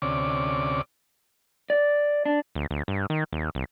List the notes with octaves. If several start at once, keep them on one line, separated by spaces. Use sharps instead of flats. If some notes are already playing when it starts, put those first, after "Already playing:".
D2 C3 C#4 D5 D6
D5
D4
D2
D2
G2
D#3
D#2
C2